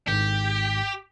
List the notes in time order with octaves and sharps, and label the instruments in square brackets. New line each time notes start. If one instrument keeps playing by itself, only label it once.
[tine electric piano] G#1 G#2 [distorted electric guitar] G4